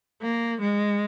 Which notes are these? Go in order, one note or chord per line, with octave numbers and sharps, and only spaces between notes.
A#3
G#3